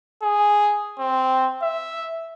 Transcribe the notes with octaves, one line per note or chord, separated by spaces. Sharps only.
G#4
C4
E5